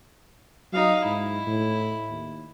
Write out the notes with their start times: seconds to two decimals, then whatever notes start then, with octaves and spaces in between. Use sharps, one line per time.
0.73 F#3 D#4 F5
1.05 G#2 E4
1.46 A2
2.10 D#2